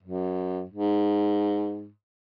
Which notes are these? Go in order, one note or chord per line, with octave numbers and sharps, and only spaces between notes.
F#2
G#2